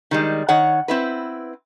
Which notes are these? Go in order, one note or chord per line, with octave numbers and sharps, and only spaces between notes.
D#3 G3 G#3
D#3 C#5 F#5
C4 E4 B4